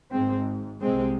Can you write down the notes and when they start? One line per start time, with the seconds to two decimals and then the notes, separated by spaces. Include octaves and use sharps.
0.11 G#1 G#2 G#3 C4
0.81 C2 C3 G#3 C4